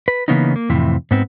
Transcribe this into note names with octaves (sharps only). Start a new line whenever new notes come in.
B4
C#3 E3 A#3 B3 C#4 D#4
A#3
F2 A2 C3 E3
G#2 B3 C4